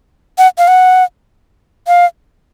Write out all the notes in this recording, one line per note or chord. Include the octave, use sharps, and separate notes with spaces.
F#5
F5
F#5
F5